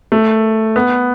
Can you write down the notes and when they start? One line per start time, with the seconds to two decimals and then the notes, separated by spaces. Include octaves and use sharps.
0.12 A3
0.76 B3